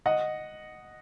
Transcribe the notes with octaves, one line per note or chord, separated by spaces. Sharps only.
D#5 F#5